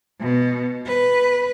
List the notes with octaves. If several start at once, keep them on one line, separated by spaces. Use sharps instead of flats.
B2
B4